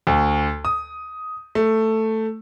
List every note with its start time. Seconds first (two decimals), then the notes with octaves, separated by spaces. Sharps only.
0.07 D2
0.65 D#6
1.55 A3